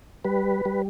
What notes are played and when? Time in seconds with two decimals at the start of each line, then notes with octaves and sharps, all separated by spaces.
0.24 G3 B4
0.65 G3